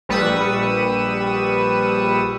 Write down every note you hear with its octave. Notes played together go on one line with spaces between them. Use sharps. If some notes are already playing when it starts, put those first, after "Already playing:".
A#1 G3 B4 C#6 D#6 E6